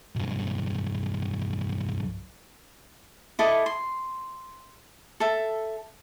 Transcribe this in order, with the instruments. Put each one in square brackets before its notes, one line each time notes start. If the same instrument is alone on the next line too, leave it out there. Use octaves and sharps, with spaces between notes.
[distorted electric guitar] B1 G2
[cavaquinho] E4 A4 D#5 D6
C6
A4 E5